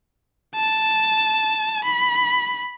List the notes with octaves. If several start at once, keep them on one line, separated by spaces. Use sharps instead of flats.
A5
B5